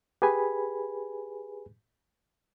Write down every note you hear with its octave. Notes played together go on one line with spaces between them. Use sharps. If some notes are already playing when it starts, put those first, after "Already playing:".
G4 G#4 B4 G#5 B5